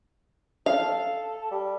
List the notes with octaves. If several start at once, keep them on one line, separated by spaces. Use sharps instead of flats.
A4 F5
G3